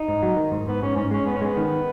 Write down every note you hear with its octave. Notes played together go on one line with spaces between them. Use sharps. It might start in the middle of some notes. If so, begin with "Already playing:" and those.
Already playing: D#4
G#2
F#3
D#3
G#2
G#2 B3
G#2 C#4
G#2 C#4
G#3 C#4
G#2 B3
C#4
G#3 B3
D#3